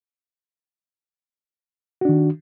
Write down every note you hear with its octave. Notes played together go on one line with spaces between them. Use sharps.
D#3 D4 F#4